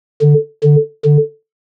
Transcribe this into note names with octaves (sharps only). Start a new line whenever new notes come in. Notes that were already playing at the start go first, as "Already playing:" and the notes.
D3
D3
D3